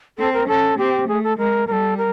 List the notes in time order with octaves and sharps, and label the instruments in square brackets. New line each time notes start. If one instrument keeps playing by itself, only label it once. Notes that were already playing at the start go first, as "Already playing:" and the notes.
[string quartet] C4 [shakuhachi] A4
[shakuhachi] A#4
[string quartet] C#4 [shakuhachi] A4
[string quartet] C4 [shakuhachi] G4
[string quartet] A3 [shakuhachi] G#4
[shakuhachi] A4
[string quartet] G#3 [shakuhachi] A#4
[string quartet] G3 [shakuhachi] A4 A#4
[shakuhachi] A#4